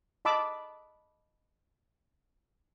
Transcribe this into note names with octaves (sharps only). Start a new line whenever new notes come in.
D#5 A5 B5 D6 E6